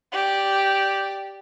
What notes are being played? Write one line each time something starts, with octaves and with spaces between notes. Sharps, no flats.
G4 D5